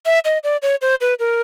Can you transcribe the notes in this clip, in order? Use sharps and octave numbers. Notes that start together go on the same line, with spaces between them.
E5
D#5
D5
C#5
C5
B4
A#4